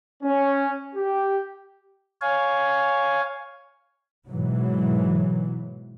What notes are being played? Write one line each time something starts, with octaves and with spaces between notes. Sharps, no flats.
C#4
G4
C#5 F5 G#5
G#2 B2 E3 F#3